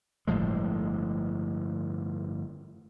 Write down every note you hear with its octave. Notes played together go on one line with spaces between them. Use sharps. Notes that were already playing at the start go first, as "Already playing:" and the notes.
G1 A2 F3 G#3